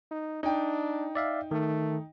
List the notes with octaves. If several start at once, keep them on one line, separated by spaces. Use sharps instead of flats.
D#4
D4 D#4 G5
D5 E5 F5
D#3 A3